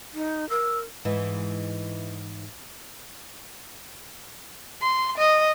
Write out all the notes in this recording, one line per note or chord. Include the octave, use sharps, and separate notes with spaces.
D#4
A#4 E6
G#2 E3
C6
D#5